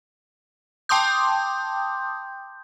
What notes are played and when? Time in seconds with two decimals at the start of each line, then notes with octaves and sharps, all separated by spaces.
0.89 G5 A5 C6 D6 D#6 G6